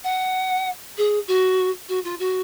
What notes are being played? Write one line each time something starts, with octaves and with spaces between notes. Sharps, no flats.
F#5
G#4
F#4
F#4
F4
F#4